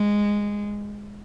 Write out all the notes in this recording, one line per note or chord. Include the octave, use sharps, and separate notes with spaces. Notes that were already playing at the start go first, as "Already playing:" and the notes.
Already playing: G#3